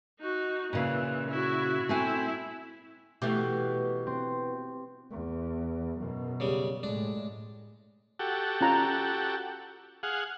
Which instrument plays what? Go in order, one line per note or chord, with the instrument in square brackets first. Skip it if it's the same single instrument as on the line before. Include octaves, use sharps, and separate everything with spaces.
[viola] D#4 F#4
[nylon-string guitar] A#2 C#3 [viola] E3
[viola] E4 F#4
[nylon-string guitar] A3 C4 G#5 [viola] E4
[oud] B2 E3 A3 [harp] G4
[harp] C4
[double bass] E2
F#2 B2
[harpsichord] C#3 G3
[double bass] A2 G#3 [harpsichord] D4
[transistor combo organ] F#4 G4 A4
[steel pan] C#4 F4 A#5
[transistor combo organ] G#4 F5 F#5